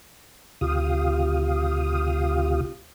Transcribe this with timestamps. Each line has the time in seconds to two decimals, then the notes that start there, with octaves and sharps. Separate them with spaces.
0.61 D2 C3 F4 G4 F5 D#6